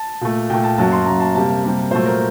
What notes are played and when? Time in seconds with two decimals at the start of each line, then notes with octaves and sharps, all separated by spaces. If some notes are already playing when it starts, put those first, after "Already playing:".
Already playing: A5
0.21 A#2 A3
0.50 A#2 A3 G5
0.64 A5
0.78 F#2 F#3 A#3 A5
0.92 C6
1.06 F#2 F#3 A#3 A#5
1.20 A5
1.35 C3 G3 A#3 A5
1.64 C3 G3 A#3
1.91 A#2 F#3 A3 C5
2.06 A#4